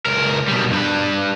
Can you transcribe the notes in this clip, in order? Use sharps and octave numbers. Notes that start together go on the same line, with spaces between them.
C#2 A#4
B2 G3
G2 B4